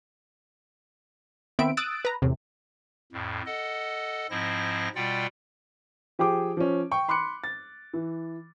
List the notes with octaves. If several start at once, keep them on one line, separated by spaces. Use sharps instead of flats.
D#3 B3 C4 E5 B5 D7
D#6 E6 F#6 A6 D7
B4 A#5
E2 A2 C3
F2 A2
A4 D#5 F#5
G#2 F3 C4 E4 D#5 A#6
B2 G3 F4 D5 F#5 G5
F3 G4 G#4 G5 D6
F3 C#4
G5 C#6
B5 C6 D6 F#6 C#7
A6
E3